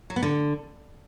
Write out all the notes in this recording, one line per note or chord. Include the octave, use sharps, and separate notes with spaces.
F#3
B3
D3